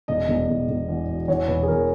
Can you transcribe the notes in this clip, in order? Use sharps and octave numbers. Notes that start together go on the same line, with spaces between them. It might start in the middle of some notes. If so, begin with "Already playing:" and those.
E1 D#5
E1
E1
E1
E2
B2
E2 C#5
E1 B4
G#4
E2 A#4